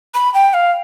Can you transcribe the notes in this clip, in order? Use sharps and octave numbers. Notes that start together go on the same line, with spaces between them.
B5
G5
F5